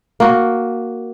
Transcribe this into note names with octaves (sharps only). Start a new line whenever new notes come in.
A#3 F#4